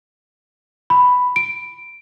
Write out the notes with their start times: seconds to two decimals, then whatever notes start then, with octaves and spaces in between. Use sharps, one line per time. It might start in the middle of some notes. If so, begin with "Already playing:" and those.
0.90 B5
1.36 D7